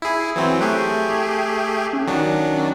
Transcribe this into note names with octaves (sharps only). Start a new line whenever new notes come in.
E4 G#4
E3 F#3 C4
A3 G4 G#4 F#6
C#4
D#3 F#3 D4